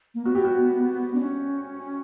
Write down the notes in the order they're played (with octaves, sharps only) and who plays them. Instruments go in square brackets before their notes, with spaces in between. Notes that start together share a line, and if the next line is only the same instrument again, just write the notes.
[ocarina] A#3
[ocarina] B3 [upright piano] F#4
[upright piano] G4
F#4
[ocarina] D4
C#4